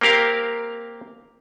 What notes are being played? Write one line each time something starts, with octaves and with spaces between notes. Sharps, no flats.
A#3 C4 G4 A#4 F5